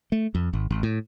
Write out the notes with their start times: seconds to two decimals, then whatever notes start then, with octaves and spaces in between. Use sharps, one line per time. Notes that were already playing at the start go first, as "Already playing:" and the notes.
0.12 A3
0.35 F2
0.53 G#1
0.71 G#1
0.83 A2